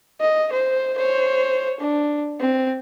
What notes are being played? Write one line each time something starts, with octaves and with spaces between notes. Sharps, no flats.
D#5
C5
C5 C#5
D4
C4